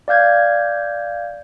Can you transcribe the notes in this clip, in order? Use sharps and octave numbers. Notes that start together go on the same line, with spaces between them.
D5 F5 G6 G#6